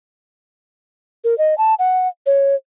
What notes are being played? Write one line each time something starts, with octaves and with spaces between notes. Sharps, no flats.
A#4
D#5
A5
F#5
C#5